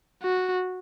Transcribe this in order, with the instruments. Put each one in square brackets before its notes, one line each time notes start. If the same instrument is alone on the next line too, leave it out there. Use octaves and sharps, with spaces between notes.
[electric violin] F#4